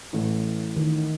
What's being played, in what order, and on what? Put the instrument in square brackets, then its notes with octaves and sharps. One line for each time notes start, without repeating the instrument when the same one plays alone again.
[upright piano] A1 A2 E3 A3
[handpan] D#3